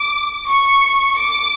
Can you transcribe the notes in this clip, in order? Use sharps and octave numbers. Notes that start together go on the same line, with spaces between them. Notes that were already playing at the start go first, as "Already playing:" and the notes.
Already playing: D6
C#6
D6